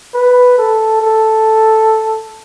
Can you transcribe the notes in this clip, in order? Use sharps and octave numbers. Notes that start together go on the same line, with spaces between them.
B4
A4
A4